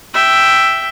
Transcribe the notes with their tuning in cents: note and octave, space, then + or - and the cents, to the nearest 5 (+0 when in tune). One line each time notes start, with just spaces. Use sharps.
E5 +5 G5 +0